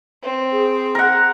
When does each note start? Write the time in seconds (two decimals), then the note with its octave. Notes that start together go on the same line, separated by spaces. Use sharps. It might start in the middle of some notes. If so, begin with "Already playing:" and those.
0.23 C4
0.52 G#4
0.95 A#4 F#5